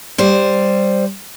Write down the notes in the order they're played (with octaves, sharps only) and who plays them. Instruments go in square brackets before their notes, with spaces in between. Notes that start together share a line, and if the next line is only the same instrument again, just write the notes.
[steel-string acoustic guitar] G3 C5